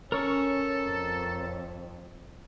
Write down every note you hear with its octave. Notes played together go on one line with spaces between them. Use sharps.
C#4 A4 A#4 C#5 C#6
F2